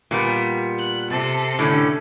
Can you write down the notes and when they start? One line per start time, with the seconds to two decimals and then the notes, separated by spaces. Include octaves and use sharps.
0.11 A#2 G3 B3
0.79 F#6
1.11 C3 A4
1.59 A2 D3 C#4